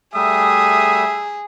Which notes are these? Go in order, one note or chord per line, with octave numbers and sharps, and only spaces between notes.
G3 A3 G#4 E5 D#6